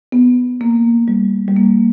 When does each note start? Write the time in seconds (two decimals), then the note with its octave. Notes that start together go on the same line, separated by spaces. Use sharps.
0.12 B3
0.61 A#3
1.08 G3
1.48 G3
1.56 A#3